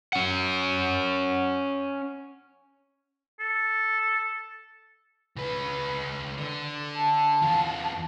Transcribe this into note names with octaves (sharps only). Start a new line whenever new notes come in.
C#4 F#5
A4
C#2 B4
D3
A5
E2 F4